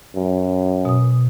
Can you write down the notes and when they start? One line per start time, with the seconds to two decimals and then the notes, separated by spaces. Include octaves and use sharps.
0.16 F#2
0.85 B2 D#6